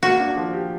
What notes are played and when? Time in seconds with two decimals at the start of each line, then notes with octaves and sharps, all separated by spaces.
0.03 A#3 F#4
0.20 D4
0.36 F3
0.53 G4